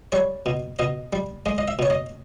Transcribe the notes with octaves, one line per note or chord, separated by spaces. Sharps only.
G3 C#5
B2
B2 D#5
G3
G#3 D#5
D#5
E5
B2 C#5
D#5